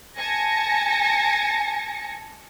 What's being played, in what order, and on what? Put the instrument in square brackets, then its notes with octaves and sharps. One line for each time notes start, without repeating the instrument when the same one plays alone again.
[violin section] G#5 A5 A#6 C#7